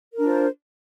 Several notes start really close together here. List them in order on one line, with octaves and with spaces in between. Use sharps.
A#4 D4 F4 C5